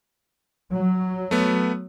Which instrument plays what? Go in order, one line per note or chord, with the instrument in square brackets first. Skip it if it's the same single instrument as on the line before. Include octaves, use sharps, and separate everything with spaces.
[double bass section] F#3
[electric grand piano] A3 B3